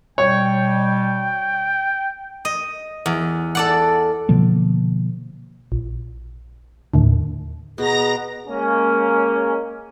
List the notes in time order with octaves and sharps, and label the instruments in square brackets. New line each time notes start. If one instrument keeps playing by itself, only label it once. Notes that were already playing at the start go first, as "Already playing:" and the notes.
[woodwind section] B2 G3 [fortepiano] C#5 [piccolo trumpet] G5
[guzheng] D#5
E2
A4 D5 F#5
[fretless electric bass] B2 D3 F3 A#3
[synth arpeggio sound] A#1
D#2 A2 D3
[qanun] B2 [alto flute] G#4 [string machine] A#5 A#6
[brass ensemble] G#3 A#3 C#4